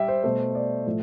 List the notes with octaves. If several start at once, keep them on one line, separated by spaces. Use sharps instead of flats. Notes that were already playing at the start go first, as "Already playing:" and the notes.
Already playing: G3 E5 G5
C5
B2 A3 C5
D5
A2 F3 A3